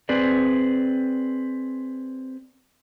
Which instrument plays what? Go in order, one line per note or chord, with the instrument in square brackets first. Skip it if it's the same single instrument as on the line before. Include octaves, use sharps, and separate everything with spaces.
[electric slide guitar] C4 G#4 B4 D5